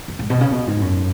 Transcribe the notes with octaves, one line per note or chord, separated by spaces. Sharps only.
F#2
G#2
B2
C#3
B2
G#2
F#2